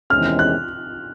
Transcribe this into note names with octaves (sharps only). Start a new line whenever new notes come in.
E2 C3 D#3 G#3 C#4 F6
F#6